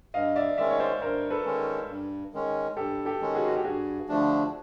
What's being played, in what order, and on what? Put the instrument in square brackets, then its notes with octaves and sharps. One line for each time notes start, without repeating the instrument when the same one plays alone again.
[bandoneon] G2 [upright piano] D#5 F5
[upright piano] D5 E5
[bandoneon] D#3 G#3 C#4 [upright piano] D5 E5
[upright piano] C#5
C5 D5
[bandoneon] G2 [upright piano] A#4 C5
[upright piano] A4 B4
[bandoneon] D#3 G#3 C#4
G2
D#3 G#3 C#4
[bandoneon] G2 [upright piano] G4 A4
[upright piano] G4 A4
[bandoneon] D#3 G#3 C#4
[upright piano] F#4 G#4
F#4
G4
[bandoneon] G2 [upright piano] F#4 G#4
[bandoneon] D3 F3 A3 D4